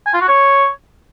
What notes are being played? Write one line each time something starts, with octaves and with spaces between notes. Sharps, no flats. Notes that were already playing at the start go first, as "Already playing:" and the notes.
G#5
F4
F#4
C#5